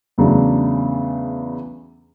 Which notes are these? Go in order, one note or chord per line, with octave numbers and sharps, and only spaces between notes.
E2 C#3 F#3 A3 D4